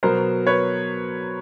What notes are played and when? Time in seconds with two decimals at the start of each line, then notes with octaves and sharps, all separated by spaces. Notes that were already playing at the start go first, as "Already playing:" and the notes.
0.03 B2 F#3 B3 A#4 C5
0.47 B4 C#5